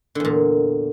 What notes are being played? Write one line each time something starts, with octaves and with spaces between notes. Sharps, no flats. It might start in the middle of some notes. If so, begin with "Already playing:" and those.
E2 A#2 D3